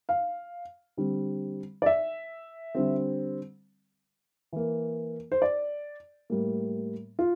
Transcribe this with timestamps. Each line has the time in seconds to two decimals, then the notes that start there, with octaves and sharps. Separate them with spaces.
0.09 F5
0.97 D3 G3 C4
1.82 D5
1.86 E5
2.75 D3 G3 C4
4.53 E3 A#3
5.32 C5
5.42 D5
6.30 A2 G3 A#3
7.19 F4